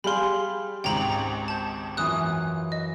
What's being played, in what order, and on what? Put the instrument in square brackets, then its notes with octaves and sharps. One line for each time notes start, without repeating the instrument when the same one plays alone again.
[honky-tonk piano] G3 [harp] G4 G#4 F5 [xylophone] B5 C6
[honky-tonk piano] G#1 C#2 G#2 [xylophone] G5 A#5 F#7
[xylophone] A5 G6
[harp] F#2 E3 F4 [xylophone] D#6 F#6
[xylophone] D#5